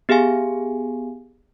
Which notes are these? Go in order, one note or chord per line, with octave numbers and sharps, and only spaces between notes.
B3 G4 G#4 F5 G#5